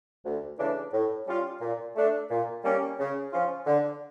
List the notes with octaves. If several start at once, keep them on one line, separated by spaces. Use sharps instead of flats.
D2
C#3 E3 A3 D4
A2
G3 C#4 F4
A#2
A3 D4
A#2
G3 A#3 C#4
C#3
F3 C#4 F4
D3